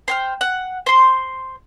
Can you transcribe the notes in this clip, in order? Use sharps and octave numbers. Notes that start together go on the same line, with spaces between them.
C5 G5 F6
F#5
C5 C6